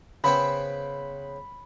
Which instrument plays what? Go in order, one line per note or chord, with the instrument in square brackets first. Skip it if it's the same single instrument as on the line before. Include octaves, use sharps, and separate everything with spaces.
[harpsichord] C#3 B3 C4 [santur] B5